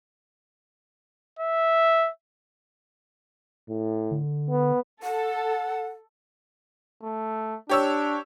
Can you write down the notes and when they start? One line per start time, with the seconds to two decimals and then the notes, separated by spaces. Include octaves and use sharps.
1.39 E5
3.69 A2
4.11 D3
4.50 B3
5.03 A4 F#5
7.03 A3
7.69 D4 G4 C#5 E6